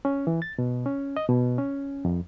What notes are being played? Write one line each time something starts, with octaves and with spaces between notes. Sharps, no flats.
C#4
E3
A6
B2
C#4
D#5
B2
C#4
F2